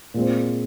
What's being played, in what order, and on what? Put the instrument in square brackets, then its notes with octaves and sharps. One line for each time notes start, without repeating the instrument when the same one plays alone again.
[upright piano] A#2 G#3 C4